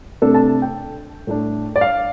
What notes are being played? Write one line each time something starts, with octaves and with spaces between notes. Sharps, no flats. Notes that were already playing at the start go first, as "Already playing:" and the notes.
C3 A3 D4 A4
A5
G5
A2 A3 D4
D5
F5